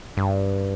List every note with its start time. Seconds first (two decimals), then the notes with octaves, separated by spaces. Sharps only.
0.17 G2